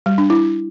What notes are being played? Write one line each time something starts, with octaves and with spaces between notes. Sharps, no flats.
G3
D4
E4